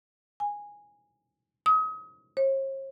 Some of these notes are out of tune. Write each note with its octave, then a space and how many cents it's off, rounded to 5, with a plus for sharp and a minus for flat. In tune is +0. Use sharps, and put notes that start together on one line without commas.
G#5 -10
D#6 +35
C#5 -45